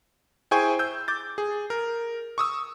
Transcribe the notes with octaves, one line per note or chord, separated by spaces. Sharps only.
E4 G#4 C5 G5 G#5 C#6
E6 G6
D6 G6 A6
G#4
A#4
C#6 D#6 E6